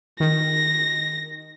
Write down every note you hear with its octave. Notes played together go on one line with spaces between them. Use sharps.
D#3 A#6